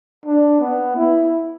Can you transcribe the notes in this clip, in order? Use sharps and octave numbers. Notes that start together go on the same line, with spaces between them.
D4
B3
E4